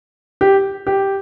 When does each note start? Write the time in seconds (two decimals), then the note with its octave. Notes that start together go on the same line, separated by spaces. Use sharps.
0.41 G4
0.87 G4